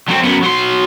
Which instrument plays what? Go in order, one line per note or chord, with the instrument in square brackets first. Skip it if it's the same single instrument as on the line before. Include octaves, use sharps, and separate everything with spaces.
[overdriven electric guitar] F#3 C4
F#2 B3
F#3 C6